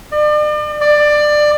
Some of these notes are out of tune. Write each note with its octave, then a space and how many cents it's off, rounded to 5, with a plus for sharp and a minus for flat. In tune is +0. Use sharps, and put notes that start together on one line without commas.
D5 +40
D5 +20